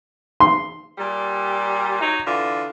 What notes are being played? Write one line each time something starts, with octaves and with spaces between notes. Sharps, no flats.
C6
A#2 G3
F#3 D#4
D3 E3 F4